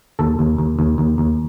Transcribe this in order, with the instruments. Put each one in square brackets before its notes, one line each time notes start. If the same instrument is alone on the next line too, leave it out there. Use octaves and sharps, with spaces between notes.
[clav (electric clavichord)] D#2 A4
D#2
D#2
D#2
D#2
D#2